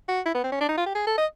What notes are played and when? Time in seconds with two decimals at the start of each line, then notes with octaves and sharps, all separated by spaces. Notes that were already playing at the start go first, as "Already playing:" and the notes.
0.08 F#4
0.26 E4
0.35 B3
0.44 C4
0.52 C#4
0.61 D4
0.69 D#4
0.78 F4
0.86 G4
0.95 G#4
1.07 A4
1.18 D#5